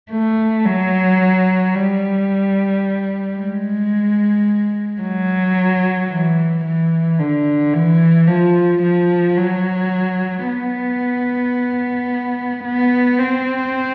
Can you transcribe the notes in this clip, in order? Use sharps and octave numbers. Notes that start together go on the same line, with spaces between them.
A3
F#3
G3
G#3
F#3
E3
E3
D3
E3
F3
F3
F#3
B3
B3
C4